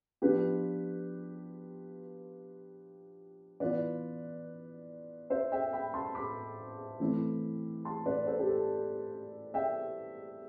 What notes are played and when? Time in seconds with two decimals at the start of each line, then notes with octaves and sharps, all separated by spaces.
0.22 F3 B3 D4 F4 G4 B4
3.60 E3 B3 F4 B4 D5
5.30 C5 E5
5.52 E5 G5
5.73 G5 B5
5.94 A5 C6
6.15 B5 D6
7.00 E3 A3 C4 E4
7.85 A5 C6
8.05 B4 D5
8.27 A4 C5
8.39 G4
8.48 A4
9.54 E5 G5